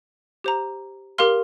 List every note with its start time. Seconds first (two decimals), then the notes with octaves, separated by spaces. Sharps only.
0.44 G4 C5 A#5
1.18 G4 A#4 F5 C6 F6